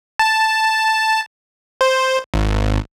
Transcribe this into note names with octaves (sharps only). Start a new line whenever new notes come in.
A5
C5
G#1